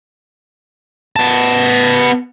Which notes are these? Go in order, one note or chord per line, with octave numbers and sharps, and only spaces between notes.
B3 A5